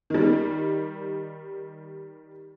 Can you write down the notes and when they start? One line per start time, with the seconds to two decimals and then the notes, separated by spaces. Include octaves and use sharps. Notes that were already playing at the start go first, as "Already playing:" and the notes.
0.10 D#3 G3